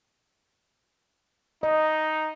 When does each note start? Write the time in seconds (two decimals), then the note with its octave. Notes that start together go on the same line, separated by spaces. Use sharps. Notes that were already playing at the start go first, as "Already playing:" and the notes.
1.63 D#4 D#5